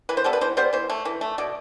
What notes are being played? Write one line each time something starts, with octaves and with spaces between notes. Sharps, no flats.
E3 B4
C5
G3 B3 A4
B4
E3 C5
G3 B3 C5
E3 C5
A3
E3
A3
B2 D5